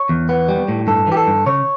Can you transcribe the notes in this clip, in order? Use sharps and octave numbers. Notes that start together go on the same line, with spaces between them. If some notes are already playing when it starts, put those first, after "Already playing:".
Already playing: C#5
E2
B3
G3
A2
G2 A4
E3 G4
A4
G2
C#3 C#5